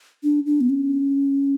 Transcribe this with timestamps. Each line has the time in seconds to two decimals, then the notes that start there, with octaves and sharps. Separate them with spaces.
0.23 D4
0.46 D4
0.61 B3
0.69 C#4